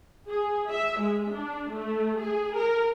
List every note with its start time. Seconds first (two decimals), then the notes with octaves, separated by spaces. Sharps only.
0.29 G#4
0.71 E5
1.00 G#3
1.32 D4
1.72 A3
2.20 G#4
2.57 A#4